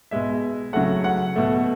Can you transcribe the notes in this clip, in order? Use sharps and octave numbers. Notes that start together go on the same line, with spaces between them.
B2 G#3 E5
C#3 F#3 A3 F#5
F#5
B2 A3